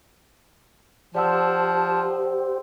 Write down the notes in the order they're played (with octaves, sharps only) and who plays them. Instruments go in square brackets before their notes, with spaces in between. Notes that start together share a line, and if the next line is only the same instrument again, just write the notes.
[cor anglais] F3 [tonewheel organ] G4 C5 [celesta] D5 F#5 E6 [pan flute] A5